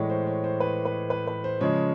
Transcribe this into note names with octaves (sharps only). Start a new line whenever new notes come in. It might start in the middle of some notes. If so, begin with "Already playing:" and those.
Already playing: A2 E3 G#3 C#5 D5
C5
C#5
C5
B4
B4
B4
B4
C5
C#3 F3 G#3 C#5